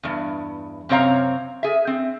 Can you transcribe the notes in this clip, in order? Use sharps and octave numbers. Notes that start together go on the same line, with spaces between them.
E2 G2
F#2 C3 C4 C#5 F5 A#5
G#4 E5
C4